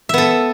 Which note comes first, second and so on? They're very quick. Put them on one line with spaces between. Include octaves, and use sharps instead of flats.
E5 B3 A4